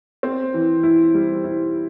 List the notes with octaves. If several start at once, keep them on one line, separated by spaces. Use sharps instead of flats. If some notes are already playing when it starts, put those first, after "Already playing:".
C4
E3
E4
G3
E4